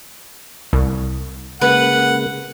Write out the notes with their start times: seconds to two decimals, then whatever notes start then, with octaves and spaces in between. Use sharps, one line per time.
0.73 C2
1.62 C#3 G#3 A#3 B4 F#5